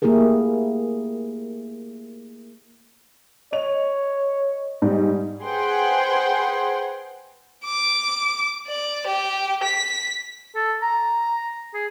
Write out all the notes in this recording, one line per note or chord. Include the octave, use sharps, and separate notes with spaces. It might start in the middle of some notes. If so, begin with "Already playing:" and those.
A3 A#3 E4 G4 G#4 A#4
C#5 D#5 F7
G#2 G3
G#4 B4 C5 F#5 G5 C6
D6
D5
G4
B6
A4
A#5
G#4